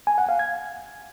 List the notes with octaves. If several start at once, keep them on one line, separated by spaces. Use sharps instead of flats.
G#5
F#5
F5
G#6